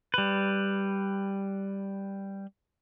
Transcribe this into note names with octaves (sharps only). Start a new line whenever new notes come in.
G3 B4